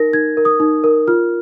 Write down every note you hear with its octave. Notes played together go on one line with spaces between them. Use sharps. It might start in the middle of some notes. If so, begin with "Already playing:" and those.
Already playing: D#4 A#4 A#6
D#4 G#6
A#4
D#6
D#4
A#4
F4 F6